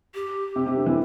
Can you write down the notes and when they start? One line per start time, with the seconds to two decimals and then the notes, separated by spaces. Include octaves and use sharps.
0.14 G4
0.56 C3
0.66 C3
0.77 D3
0.86 E3